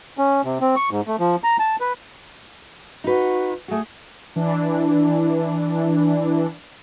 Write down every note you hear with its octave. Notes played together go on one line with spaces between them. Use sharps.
C#4
C3
C4
C#6
G#2
A3
F3
A#5
A5
B4
D#4 F#4 B4
A3 F#4 G#4
E3 D4